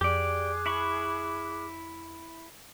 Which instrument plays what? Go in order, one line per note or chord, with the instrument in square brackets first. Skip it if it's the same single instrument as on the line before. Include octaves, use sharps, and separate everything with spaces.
[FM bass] F2 [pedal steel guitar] G4 D5 [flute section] G#4 D6 F#6
[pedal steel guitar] E4 B5 C#6